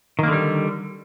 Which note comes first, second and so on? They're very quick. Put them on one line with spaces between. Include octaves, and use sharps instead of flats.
D#3 A#3 D3 G3